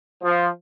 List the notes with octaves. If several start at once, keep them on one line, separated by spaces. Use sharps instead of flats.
F3